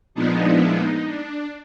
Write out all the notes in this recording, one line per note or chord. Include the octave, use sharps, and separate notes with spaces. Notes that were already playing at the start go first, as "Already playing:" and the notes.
A#2 F3 G#3 B3 D4 D#4
E4
D#4
D4